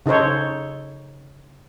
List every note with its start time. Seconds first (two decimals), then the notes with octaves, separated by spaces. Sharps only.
0.06 C#3 D#4 A4 C5 C#5